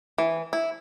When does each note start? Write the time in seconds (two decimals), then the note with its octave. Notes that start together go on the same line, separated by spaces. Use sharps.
0.18 E3
0.53 E4